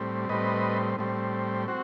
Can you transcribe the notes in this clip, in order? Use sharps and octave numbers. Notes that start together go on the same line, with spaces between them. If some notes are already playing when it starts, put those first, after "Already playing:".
Already playing: A2 G3 C4
A2 G3 C4 B4 D#5
A2 G3 C4
C4 F#4